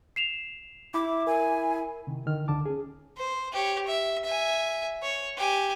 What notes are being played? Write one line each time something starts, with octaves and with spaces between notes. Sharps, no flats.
C7 E7 F7
E4 D6
A#4 G#5
C3 D#3
D3 D#3 F6
C#2 D3 A5 D6
C#4 G#4
C5
G4 C#5
E5
E5 G#5
C#5
G4 G#5